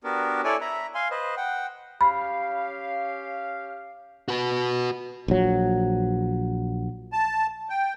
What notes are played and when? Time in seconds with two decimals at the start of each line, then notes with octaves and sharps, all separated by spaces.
0.04 B3 D4 F#4 G4 A#4
0.44 E4 A4 C#5 D5 G#5
0.61 E5 A#5 B5
0.95 F5 G#5 C6
1.11 B4 C5 D#5
1.37 F#5 G5
2.01 C#4 G4 F5 B5
4.28 F#4 B4
5.28 A#1 F#3
7.12 A5
7.69 G5